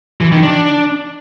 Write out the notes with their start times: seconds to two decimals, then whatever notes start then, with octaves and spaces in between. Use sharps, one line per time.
0.21 E3
0.32 D#3
0.43 D4